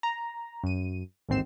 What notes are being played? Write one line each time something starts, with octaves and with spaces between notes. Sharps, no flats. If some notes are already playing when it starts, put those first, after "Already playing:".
A#5
F#2 D#7
A1 D#2 G#2 C4 C7 E7